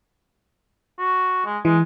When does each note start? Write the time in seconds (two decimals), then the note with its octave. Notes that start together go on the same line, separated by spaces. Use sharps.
0.99 F#4
1.45 G#3
1.65 E3 G#3